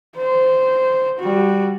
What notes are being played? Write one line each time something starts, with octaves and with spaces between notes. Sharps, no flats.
C5
G3 F#4